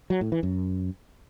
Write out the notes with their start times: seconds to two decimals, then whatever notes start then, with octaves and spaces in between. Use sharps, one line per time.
0.10 F#3
0.21 A2
0.32 E3
0.43 F#2